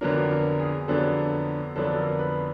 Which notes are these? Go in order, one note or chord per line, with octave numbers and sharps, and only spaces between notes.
F2 D3 F#3 B3 D4 A#4
A#4
G#4
F2 D3 F#3 B3 D4 A4
F2 D3 F#3 B3 D4 A4
A#4
B4